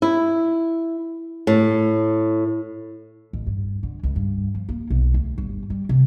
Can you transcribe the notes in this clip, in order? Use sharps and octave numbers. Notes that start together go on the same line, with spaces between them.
E4
A2
A1
G2
D3
C#2
G2
F3
A#3
B1
D2
G1
G3
C3